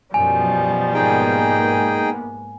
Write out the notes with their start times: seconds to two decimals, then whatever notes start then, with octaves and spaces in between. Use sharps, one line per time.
0.14 F#2 B2 F3 G3 G#5
0.94 G#2 A#3 B3 D#4 G#4 G5